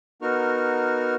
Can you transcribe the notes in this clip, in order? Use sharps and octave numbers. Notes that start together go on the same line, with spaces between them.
B3 D#4 F#4 A#4 C#6 F6